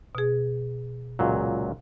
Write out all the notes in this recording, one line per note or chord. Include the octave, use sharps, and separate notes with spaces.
B2 G#4
C#2 A#2 F#3